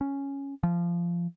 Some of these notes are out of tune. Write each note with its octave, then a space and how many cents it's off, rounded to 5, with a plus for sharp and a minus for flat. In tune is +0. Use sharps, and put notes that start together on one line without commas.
C#4 +0
F3 -20